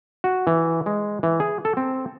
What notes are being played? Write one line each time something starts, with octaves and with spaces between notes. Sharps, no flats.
F#4
E3
G#3
E3
G#4
A4
C4